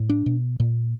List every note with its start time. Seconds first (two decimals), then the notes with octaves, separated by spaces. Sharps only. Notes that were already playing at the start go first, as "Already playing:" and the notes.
Already playing: A2
0.09 D4
0.26 B2
0.60 A#2